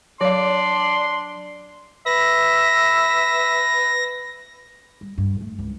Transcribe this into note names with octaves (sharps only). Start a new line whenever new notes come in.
F#3 D4 D5 F5 C6
B4 E5 A#6
G3
G2
A3
C#2